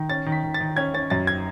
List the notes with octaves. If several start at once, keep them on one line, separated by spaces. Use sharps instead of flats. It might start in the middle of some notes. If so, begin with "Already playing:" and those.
Already playing: D#3
C#4 A6
D#3
B6
D#3
A6
D#3
C#4 G#6
C#4 A6
F#2 A6
G#6